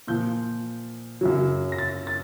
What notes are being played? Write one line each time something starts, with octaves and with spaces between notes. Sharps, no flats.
A#2 F3 G6
F#2 C#3 F#3
A#6
A6
A6